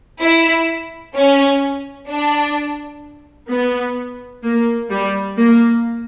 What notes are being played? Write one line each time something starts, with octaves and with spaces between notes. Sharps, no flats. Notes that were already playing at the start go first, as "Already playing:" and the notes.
E4
C#4
D4
B3
A#3
G3
A#3